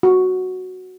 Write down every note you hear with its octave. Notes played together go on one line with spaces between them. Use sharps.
F#4